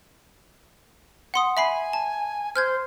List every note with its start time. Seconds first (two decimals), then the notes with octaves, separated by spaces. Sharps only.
1.34 F#5 C6 D#6
1.57 E5 G#5 B5 C7
1.93 A5
2.56 C5 F6 G6 G#6